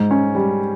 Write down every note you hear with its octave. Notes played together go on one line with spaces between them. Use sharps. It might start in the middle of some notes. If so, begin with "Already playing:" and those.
Already playing: G#2
C#4
G3